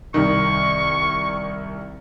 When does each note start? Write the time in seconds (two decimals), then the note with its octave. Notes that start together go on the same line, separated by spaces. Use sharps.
0.14 C2 D#3 C#6